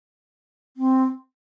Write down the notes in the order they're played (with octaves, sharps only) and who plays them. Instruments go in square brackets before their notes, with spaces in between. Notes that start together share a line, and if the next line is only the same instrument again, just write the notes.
[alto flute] C4